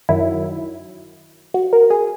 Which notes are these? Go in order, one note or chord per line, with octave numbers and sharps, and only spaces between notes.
F#2 D#3 F#3 E4
F#4
A#4
G#4